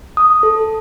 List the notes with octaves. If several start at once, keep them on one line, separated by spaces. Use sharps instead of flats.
D#6
A4